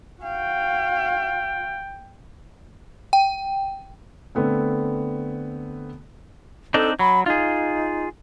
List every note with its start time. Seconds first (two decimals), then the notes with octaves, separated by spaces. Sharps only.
0.23 F#4 F5 G5
3.13 G5
4.35 D3 A3 B3 C4
6.74 C4 D4 D#4 A4
6.99 F#3 B5
7.26 D#4 F4 G#4